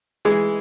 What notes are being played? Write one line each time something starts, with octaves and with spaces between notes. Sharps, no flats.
E3 G#3 G#4